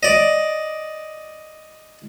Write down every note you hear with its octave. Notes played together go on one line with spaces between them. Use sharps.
D5 D#5